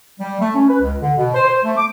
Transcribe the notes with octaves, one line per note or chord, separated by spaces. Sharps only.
G3
A3
C#4
B4
C#2
D3
B2
C5
C5
A3
D6